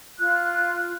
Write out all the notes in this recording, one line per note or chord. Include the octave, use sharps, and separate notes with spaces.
F4 F#6